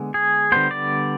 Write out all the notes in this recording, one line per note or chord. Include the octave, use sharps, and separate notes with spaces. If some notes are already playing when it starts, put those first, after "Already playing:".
Already playing: D3 G#3 B3
G#4
D3 G3 B3 C5
D5